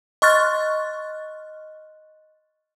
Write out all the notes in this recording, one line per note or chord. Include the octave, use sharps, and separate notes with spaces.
D#5 C6 C#6 F6 F#6 A6